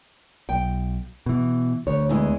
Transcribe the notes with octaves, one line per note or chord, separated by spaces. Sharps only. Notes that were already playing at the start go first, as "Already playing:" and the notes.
B1 G5
B2 E3
D2 C#5
E2 G#3 E4